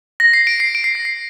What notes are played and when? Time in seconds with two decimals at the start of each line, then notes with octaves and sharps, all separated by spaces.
0.20 A#6
0.33 C7
0.47 D7
0.60 C7
0.75 D7
0.84 C7
0.95 A#6
1.05 C7